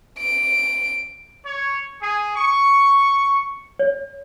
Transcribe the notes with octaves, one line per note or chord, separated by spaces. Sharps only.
D7
C#5
G#4
C#6
C#5